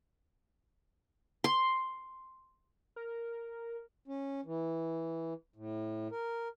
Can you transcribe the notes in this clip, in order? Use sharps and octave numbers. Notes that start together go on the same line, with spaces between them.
C6
A#4
C#4
E3
A2
A#4